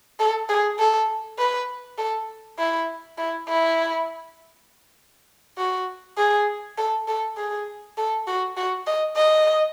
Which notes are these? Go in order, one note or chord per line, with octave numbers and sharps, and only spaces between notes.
A4
G#4
A4
B4
A4
E4
E4
E4
F#4
G#4
A4
A4
G#4
A4
F#4
F#4
D#5
D#5